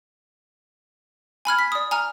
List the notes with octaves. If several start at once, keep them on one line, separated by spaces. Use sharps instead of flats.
G#5 B5 F6 G#6
B6
D5 D#6
G#5 A#5 F6